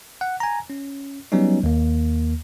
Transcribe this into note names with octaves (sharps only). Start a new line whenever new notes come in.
F#5
G#5 A#5
C#4
F#3 G3 B3 C#4 D#4
D#2 A#3